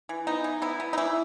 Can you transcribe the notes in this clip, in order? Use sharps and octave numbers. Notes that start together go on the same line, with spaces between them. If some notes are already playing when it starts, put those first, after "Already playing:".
E3
B3 D#4
E3
B3 E4
B3
D#4
E3 E4